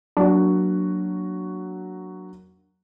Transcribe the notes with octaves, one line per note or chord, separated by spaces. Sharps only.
F#3 A#3 D4 F#4